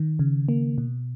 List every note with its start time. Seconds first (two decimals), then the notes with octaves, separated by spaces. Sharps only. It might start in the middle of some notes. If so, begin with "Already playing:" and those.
Already playing: D#3
0.19 C#3
0.49 A#3
0.78 B2